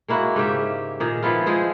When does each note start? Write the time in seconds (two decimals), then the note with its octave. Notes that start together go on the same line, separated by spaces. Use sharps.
0.08 G#3 A#3 E4 F#4
0.36 G#2 C#3 G4 E5
1.00 A#2 D#3 G#4
1.23 F3 B3 E4 F4
1.46 F3 G#3 G#4 C5